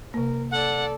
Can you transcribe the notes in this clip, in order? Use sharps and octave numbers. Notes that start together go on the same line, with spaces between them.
C3 A#3 A#4
A4 D5 F#5